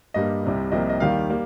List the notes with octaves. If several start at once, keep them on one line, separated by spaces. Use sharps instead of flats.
G2 G3 A#3 D#5
C2 C3 G3
C2 C3 F3 A#3 D#5
D#5
D#2 D#3 G3 A#3 F5
G3 A#3